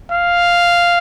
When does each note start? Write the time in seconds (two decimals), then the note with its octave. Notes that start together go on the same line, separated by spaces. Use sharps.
0.11 F5